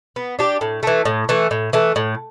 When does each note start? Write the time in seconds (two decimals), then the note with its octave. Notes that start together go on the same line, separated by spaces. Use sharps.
0.16 B3
0.39 D4 G4
0.61 A2
0.83 E3 A3
1.05 A2
1.29 E3 A3
1.51 A2
1.73 E3 A3
1.96 A2